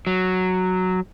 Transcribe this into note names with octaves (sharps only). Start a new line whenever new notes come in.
F#3